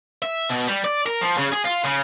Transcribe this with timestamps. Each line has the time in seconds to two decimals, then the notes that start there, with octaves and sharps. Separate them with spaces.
0.22 E5
0.49 B2
0.67 G3
0.84 D5
1.06 A#4
1.21 F3
1.37 C#3
1.52 G#4
1.64 F4
1.84 C#3